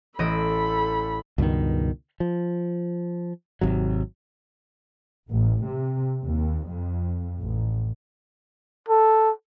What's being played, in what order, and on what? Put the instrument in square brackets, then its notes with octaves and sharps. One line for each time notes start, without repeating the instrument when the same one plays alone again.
[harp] A1 D#5 D7 [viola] A4 B5
[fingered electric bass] C#2 G2 B2 D#3
F3
G#1 C3 F#3
[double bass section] A1
C3
D#2
F2
A1
[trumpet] A4